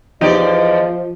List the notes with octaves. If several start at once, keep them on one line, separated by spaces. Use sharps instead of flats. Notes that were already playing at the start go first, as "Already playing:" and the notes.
E2 F3 D#4 G4 D5 D#5